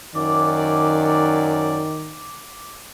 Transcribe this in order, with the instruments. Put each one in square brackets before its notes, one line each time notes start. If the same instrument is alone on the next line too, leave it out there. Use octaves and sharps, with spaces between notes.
[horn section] F#2 D5 [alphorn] D#3 [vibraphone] D6